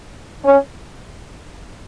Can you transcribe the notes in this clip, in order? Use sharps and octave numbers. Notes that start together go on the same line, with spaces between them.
C#4